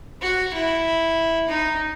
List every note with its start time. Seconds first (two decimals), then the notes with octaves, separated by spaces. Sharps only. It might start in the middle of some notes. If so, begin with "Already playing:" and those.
0.22 F#4
0.54 E4
1.48 D#4